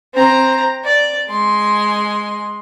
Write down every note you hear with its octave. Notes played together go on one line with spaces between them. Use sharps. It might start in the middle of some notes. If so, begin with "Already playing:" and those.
C4 A#5
D5
G#3 C6